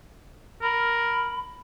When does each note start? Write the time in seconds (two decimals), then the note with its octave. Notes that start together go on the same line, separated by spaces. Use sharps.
0.62 A#4 B5